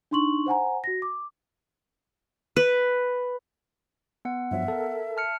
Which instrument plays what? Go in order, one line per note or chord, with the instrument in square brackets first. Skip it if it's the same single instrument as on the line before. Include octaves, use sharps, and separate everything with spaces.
[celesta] D4 D#4 C6 C#6 F#7
C5 F#5 G#5 A#5
F#4 A#6
D6
[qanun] B4
[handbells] B3 F#5
[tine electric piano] G2 F3 F#3 [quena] E5
[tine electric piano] A4 A#4
[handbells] A5 F6 C#7